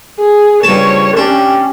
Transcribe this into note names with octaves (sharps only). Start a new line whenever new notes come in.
G#4
G2 C#3 F3 C#5 A5
C#4 D4 G4